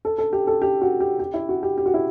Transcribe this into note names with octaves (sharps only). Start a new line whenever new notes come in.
A4
A4
G4
A4
G4
F#4
G4
G4
E4
F#4
G4
G4
F#4
E4